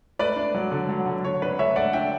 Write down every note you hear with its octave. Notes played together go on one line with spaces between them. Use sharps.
A3 B4 D5
D4
F#3
D3
F#3
D3
D3 C#5
D4 B4
A3 C#5 E5
A3 D5 F#5
D4 E5 G5